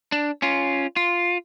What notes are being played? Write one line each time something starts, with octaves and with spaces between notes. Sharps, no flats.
D4
C#4 F4
F4